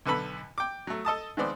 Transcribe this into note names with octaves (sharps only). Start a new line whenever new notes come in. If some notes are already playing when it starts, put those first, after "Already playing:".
B1 D3 B3 A4 B5
G5 D6
F#3 A3
A4 D#5 A5 D#6
D#3 F3 G#3 B3 C4 D5